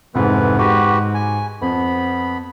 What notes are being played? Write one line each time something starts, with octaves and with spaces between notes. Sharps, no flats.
F1 G#2 E3 B3 B4
G#2 F#4 G4 B4
G#5
F2 B3 B5